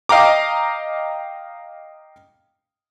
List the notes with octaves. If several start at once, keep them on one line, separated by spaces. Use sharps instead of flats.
D#5 F5 G5 A#5 D6